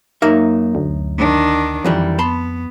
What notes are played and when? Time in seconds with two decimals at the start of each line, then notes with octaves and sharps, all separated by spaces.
0.22 F#2 A#3 D#4 E5
0.75 D2
1.18 D#3 D4
1.84 F2 D#3 E3 G3
2.19 B3 A5 B5 C6